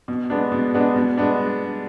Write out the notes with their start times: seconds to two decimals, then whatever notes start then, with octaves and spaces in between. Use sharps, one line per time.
0.08 B2
0.30 G#3 B3 D4
0.52 B2
0.74 G#3 B3 D4
0.96 B2
1.17 G#3 B3 D4